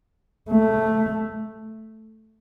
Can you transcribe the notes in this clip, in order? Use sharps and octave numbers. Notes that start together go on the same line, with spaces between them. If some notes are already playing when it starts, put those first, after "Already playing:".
A3